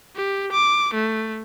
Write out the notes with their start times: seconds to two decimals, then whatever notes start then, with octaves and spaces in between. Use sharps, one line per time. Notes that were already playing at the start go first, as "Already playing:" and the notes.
0.15 G4
0.52 D6
0.94 A3